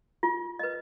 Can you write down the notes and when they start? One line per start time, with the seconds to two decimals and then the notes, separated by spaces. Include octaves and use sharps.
0.23 F4
0.59 B4 D#5